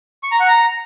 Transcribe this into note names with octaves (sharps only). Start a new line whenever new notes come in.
C#6
A#5
F#5
A#5